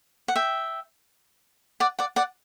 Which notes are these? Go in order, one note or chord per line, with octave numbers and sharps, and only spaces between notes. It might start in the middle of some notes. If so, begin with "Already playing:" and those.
F#5
E5 G5
D5 F#5
D5 F#5
D5 F#5